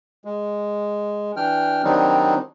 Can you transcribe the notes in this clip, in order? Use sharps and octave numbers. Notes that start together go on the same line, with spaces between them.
G#3
E3 D4 G5 F6
D#3 F#3 G3 C4 D4 D#4